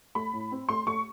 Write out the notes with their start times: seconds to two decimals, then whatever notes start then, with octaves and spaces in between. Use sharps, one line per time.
0.15 A3 B5
0.33 A2
0.52 C4
0.69 A3 C6
0.87 A3 C#6